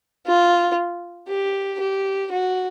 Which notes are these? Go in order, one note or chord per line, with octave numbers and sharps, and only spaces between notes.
F4
G4
G4
F#4